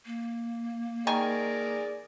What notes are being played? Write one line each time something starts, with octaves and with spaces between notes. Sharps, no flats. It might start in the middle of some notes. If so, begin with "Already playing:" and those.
A#3
D#3 G#4 A#4 D5 G#5 C#6